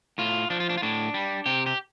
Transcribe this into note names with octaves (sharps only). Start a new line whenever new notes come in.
A2 F4
F3 D4
F4
D4
F4
A2 D4
G3
C3 G4
G4